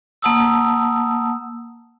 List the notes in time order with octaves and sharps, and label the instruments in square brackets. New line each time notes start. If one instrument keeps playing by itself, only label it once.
[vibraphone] A#3 F#5 A5 D#6 E6